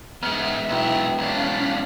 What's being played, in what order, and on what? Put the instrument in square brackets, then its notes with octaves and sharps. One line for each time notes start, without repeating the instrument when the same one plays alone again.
[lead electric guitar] G#2 [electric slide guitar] G#3 B3 [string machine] E5 [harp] F6
[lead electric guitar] B1 [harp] B2 E4 G5
[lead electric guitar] B1 D4 [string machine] C#4 F5 B6